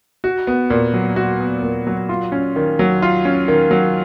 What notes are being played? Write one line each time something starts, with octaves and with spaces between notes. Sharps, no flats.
F#4
B3
A#2
F#3
F#4
B3
A#2
F#3
F4
C#4
D#3
F#3
F4
C#4
D#3
F#3